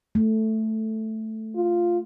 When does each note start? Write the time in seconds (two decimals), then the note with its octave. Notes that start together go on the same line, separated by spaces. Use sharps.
0.15 A3
1.55 F4